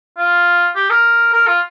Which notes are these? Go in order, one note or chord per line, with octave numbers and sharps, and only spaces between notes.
F4
G4
A#4
A#4
F4